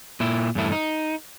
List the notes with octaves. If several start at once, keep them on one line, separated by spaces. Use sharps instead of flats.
A#2 E4
E2 G2 A3 E4
D#4